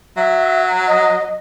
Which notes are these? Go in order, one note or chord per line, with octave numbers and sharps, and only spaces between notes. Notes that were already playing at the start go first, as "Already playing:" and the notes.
F#3 E5
D#5